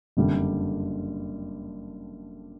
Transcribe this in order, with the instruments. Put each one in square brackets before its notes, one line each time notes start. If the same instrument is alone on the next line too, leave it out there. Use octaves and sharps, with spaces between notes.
[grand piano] F#1 F2 D3 G3